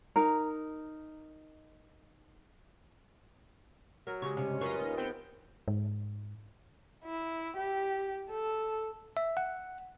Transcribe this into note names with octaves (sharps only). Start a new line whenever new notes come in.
D#4 A#4
F#3 A#4
C#3 G#3 G4 C#5
G2 C3 C#4
F#2 F#3 F4 A#4 B4 C#5 D#5
D#2
B3 C4 G5
G#2
E4
G4
A4
E5
F#5